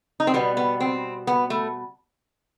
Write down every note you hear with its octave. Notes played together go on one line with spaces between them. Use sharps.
D#4
C4
B2 G3 B3
B3
C4
B3
A3